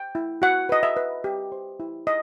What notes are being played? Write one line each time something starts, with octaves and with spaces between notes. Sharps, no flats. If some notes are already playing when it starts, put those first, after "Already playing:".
Already playing: G5
E4
F#4 F#5
B4 D#5
E5
B4
G4
C5
E4
D#5